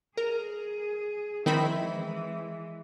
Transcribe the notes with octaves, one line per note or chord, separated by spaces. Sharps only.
G#4 A#4
D#3 F3 C4 E4 B5
E3 G#3